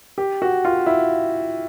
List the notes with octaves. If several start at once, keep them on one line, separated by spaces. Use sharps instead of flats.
G4
F#4
F4
E4